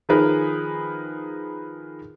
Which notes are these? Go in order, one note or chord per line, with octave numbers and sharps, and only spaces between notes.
D#3 F3 D#4 G#4 A#4 B4